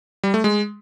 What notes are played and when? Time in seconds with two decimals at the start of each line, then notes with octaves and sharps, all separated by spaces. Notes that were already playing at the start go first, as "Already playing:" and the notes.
0.23 G3
0.34 A3
0.44 G#3